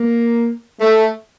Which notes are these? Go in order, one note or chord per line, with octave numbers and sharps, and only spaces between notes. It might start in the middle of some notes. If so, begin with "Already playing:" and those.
Already playing: A#3
A3